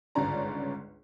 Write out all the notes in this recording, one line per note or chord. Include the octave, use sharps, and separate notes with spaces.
G1 C#2 G#2 C#4 D5 A#5